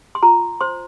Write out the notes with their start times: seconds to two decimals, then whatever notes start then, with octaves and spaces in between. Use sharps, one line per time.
0.15 C6
0.23 F4 A#5
0.61 C5 C6